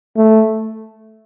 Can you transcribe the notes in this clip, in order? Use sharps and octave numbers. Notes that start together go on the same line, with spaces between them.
A3